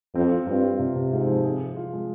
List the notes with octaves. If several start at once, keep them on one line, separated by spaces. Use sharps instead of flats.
F2 C4
F4
G2 C4
F4
C3
C3
G#2 F4
F3
G#4
G#4
F4
G#3